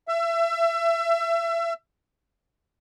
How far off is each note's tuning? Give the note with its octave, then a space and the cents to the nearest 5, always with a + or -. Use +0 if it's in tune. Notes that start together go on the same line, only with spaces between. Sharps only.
E5 +30